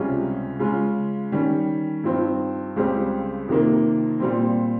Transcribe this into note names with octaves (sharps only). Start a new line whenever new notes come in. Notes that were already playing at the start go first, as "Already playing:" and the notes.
Already playing: C#2 C3 G3 C#4 F4
C#3 G#3 C#4 F4
D#3 G3 C#4
G2 F3 C4 D#4
C#2 C#3 G3 C4 G4
F2 C3 D#3 A#3
A#2 G3 C4